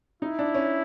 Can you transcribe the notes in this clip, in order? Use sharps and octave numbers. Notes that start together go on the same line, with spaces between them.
D#4 E4
D4
C#4